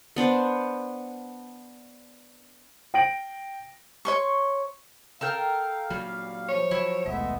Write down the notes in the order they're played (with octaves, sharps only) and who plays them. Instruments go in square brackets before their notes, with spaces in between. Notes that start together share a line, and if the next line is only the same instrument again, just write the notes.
[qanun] B3 D4 C5
[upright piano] G5 A#6 D7 F#7
[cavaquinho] C#5 C6 C#6
[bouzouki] A4 A#4 G5 [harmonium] F5
[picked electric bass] A#2 F#3 [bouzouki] G3
[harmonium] F3 [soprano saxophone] C#5
[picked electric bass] F#3 [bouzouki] E4
[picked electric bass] D#1 B1 [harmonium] G#3 A3 B3 [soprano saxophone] E5